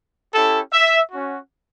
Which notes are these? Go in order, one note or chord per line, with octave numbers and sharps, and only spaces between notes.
C#4 E4 G4 A4
E5
C#4 F#4